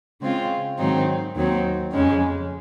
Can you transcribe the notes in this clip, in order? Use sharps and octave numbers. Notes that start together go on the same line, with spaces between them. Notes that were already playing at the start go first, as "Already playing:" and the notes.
C#3 G#3 C4 F4
G#2 D#3 F#3 C4 D#4
D#2 D#3 F#3 C4 D#4
F2 C#3 G#3 C#4